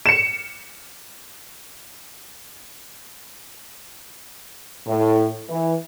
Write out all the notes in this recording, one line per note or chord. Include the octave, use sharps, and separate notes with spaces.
C#7 E7
A2
E3